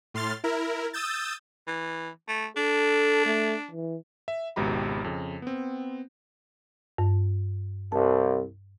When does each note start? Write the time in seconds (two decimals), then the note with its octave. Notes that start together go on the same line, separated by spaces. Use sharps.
0.14 A2 C6 F6 A6
0.44 E4 A#4
0.93 D#6 E6 G6 A6
1.67 E3
2.28 A3
2.57 D4 A4
3.26 A3
3.71 E3
4.28 E5
4.56 G#1 C#2 B2 G4 A#5 B5
5.04 F2 C#3
5.42 B3 C4
6.98 G2
7.92 C2 A5